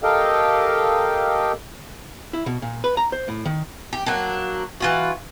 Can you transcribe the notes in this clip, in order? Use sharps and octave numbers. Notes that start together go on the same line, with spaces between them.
G4 A4 A#4 D#5 F5 G5
E4
B2
A#2
B4
A#5
C5
A2
D#3
G4
F#3 A#3 D4
E3 F4 F#4